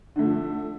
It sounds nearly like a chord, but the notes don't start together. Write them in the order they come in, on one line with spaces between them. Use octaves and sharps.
D3 A3 F3